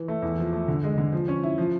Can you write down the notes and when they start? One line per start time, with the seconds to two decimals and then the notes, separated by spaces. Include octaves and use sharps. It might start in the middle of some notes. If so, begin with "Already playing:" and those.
Already playing: E3
0.08 A3
0.22 E2
0.38 F3
0.53 A3
0.68 D3
0.83 G#3
0.98 D3
1.12 F3
1.28 C#4
1.43 E4
1.58 F3